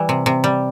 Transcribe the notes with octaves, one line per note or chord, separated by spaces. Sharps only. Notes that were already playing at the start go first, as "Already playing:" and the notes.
Already playing: E3 G3
C3
C3
G3